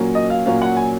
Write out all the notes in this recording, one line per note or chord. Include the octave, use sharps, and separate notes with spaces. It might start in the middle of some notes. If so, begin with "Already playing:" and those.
Already playing: A#2 F#3 A#3 C#4
D#5
F5
A#2 F#3 A#3 C#4 F5
F#5
G#5